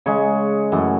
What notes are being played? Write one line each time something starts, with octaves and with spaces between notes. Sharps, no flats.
C#3 G#3 C#5
F#2 E3 A3